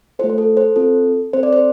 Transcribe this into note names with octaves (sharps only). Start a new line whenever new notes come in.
A3 F4 A4 C5
C5
A4
C5
C4 F4 A4
C4 A4 C5
D5
C5